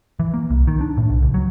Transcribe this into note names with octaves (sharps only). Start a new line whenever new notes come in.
E3
A#3
C2
D#3
D4
A2
B1
C#2
F#3